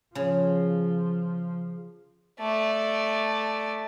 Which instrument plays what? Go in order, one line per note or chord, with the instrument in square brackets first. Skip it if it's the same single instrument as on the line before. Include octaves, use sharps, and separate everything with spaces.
[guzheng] C#3 [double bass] F3
[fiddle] A3 D5